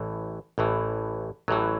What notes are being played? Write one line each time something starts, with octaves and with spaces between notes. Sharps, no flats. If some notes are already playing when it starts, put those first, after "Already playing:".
Already playing: A1 A2 E3
A1 A2 E3
A1 A2 E3 F#3